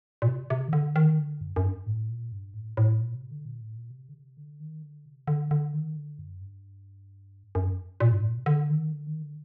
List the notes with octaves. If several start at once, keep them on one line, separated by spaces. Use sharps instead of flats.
A#2
C3
C3
D#3
D3
D#3
D3
F#2
F#2
G2
A2
A#2
G2
A2
A2
A#2
C3
D3
A#2
A2
A#2
C3
D3
C3
D3
D#3
D3
C3
D3
D3
D#3
D3
F#2
G2
F#2
A#2
G2
A2
A#2
C3
D3
D#3
D3
D#3
D3